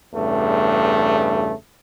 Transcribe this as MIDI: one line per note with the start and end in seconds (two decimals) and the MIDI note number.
0.14 1.52 40
0.14 1.52 43
0.14 1.52 49
0.14 1.52 57